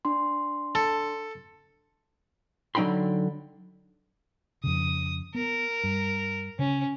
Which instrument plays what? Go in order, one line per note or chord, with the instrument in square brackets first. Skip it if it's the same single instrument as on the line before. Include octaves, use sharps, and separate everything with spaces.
[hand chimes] D4 C6
[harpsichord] A4
[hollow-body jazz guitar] D3 F#3 D#4 G5 B5 C6
[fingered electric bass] F2 C#3 [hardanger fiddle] D#6
[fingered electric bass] B3 [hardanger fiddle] A#4
[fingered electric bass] G2
[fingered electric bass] C#3 [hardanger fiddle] C#4